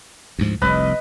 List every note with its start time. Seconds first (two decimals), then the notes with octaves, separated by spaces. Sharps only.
0.39 D2 G#2 F3
0.62 F1 C2 B4 D#5